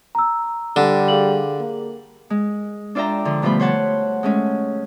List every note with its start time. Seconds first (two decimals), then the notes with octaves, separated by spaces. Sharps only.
0.15 A#5 E6
0.76 D3 G3
1.08 G#4 F5 F#7
1.59 A#3
2.30 G#3
2.95 D4 F4 D5 E5 G5 A#5
3.25 D3 F3
3.42 B2 F3 G3 A3 C5 B5
3.60 C5 C#5 F#5 A5
4.23 G#3 A3 C#4